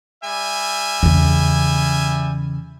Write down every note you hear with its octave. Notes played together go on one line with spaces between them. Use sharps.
G3 E5 G#5
E2 C#3